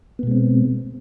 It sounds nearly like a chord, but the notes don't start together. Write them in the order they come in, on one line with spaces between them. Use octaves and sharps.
B3 B2 G#3 C4